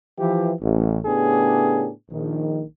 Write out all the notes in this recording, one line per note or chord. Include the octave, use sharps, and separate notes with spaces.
E3 F3 G4
A1
A2 C#3 B3 D4 G4 G#4
A#1 D#3